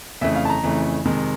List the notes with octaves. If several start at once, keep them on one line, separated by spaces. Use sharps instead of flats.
F2 C#3 E3 A3 E5
F5
A5
A#5
F2 C#3 E3 A3
F2 C3 D#3 G#3